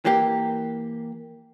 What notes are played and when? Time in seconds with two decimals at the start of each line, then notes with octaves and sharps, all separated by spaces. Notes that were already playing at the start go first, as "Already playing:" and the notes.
0.05 E3 A#3 G4